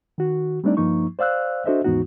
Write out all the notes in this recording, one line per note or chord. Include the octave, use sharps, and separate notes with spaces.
D#3 F#4
G3 A3 C4 D4 D#4 D5
G2 F3 A#3 D#4 C#6
C5 D5 F5 E6 F#6
D4 F#4 A4 C5 D#5 E5
D#2 G#2 E3 B3 D#4 F#4